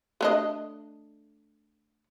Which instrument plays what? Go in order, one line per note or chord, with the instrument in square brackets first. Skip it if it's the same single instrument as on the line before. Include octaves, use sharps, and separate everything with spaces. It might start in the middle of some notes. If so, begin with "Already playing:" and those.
[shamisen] A3 D4 D#5